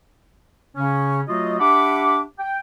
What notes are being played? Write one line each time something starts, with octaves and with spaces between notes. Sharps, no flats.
C#3 C#4
F#3 A3 F4 F#4 D#5
D4 G4 E5 F#5 B5 D6
G5